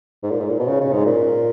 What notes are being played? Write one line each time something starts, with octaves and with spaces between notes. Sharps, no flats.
G#2
A#2
G#2
A#2
B2
C#3
C#3
G#2
A#2